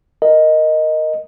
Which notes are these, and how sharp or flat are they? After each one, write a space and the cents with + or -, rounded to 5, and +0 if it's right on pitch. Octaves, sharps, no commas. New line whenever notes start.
A#4 +0 D#5 +0